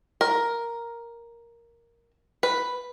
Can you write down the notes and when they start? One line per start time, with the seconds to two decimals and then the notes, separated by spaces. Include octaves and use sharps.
0.21 A#4
2.43 B4